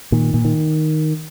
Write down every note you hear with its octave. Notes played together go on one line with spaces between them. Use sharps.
A#2 D#3
A#2
D#3